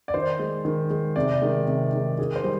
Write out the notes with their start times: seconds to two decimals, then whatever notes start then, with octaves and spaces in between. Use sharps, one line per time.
0.08 D5
0.14 D#3 C5
0.39 G#3
0.65 D#3
0.90 G#3
1.16 C3 D5
1.42 D#3 G#3
1.67 C3
1.93 D#3 G#3
2.19 D#3 G#4
2.36 C5
2.44 G3